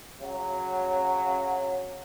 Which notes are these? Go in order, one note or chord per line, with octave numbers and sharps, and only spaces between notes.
C#3 F#3